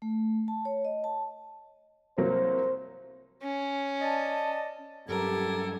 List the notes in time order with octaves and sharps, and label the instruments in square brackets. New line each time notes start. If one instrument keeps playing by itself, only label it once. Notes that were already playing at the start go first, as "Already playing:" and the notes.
[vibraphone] A3
A5
C#5
D#5
A5
[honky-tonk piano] C2 F#3 A#3 [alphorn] C5
[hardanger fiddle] C#4
[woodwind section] D5 D#5 A5
[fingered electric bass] G2 F#3 [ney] G4 [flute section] A4 G#6 [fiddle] A#4